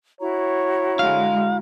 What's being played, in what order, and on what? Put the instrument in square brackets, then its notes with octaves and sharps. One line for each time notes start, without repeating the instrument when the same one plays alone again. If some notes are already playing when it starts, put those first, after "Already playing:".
[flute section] E4 F#4 A#5 [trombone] C#5
[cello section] D3 G#3 [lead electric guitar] F5